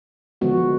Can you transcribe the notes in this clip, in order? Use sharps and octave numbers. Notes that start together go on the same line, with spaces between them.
D3 F3 G#3 B3 F#4